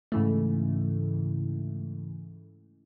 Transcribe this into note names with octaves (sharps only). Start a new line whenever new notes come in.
G#2 C#3 E3 A3